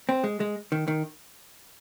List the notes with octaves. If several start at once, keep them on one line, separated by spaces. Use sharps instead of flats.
C4
G#3
G#3
D#3
D#3